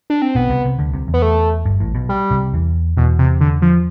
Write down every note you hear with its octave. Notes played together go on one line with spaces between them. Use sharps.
D4
C4
B1 B2 B3
C2 C3
C2 C3
D2 D3
C2 C3
E2
B3
A3
G1 G2
A1 A2
B1 B2
G3
C2 C3
E2 E3
E2 B2 E3
C3
D3
F3